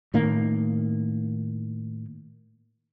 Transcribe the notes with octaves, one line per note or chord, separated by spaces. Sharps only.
A2 D#3 A#3